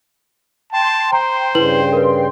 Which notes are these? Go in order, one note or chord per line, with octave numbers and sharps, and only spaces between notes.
G5 A5 C6
C5 A#5
G2 C#3 E4 B4 F#7
A#4 B4